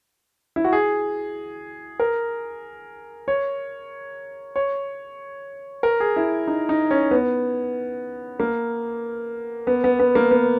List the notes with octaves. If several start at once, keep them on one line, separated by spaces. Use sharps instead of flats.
E4
F#4
G#4
A#4
C#5
C#5
A#4
G#4
E4
D#4
D#4
C#4
B3
A#3
B3
B3
B3
A#3
B3